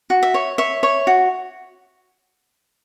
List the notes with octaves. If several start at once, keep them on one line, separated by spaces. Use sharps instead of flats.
F#4
E5
C#5
C#5 E5
C#5
F#4